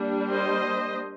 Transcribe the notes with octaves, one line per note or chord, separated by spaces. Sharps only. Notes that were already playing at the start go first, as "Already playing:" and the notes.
Already playing: G3 A#3 D4
C5 D#5